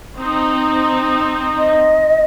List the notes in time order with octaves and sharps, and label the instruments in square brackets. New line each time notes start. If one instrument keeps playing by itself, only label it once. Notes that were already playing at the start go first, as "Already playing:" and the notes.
[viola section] C4 D#4
[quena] D#5